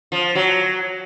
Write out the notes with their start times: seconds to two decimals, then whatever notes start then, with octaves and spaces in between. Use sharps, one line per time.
0.12 F3
0.35 F#3